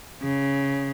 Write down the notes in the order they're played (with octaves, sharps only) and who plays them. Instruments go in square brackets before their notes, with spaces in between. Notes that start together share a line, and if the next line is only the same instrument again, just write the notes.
[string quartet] C#3